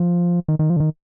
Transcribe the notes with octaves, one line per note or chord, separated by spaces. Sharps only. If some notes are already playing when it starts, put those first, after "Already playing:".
Already playing: F3
D#3
D#3
F3
D3
D#3